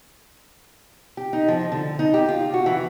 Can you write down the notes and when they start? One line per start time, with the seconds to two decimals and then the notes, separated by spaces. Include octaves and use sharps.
1.17 G4
1.33 D#4
1.48 F3
1.72 D3
1.99 D#4
2.14 G4
2.28 F4
2.54 F#4
2.66 E3